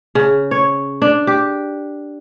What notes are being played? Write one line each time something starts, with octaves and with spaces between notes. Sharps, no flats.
C#3
C#5
D4
G4